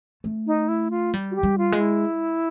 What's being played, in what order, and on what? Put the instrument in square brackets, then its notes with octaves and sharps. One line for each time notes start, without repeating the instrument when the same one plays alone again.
[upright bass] A3
[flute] D#4
E4
F4
[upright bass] G3
[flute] F#4
G4
[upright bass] G3
[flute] F4
[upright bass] G#3
[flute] E4